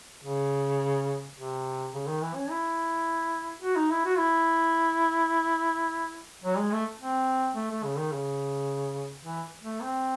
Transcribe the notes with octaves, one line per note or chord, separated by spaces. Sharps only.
C#3
C3
C#3
D#3
E3
C#4
E4
F#4
D#4
E4
F#4
E4
F#3
G#3
A3
C4
A3
A3
C#3
D#3
C#3
E3
A3
C4